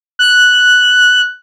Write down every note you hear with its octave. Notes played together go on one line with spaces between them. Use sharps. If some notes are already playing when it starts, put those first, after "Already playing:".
F#6